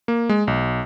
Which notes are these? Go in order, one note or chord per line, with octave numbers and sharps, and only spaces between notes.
A#3
G#3
B1